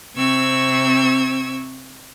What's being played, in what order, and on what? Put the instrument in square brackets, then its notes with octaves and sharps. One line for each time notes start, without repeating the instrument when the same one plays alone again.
[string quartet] C3 C4 C#6 E6 G#6